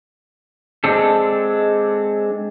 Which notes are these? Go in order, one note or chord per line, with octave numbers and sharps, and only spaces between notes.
G#3 C4 D4 A4